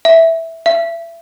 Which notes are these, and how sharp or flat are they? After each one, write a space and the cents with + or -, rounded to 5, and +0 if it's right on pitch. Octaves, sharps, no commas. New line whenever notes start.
E5 -5
E5 +30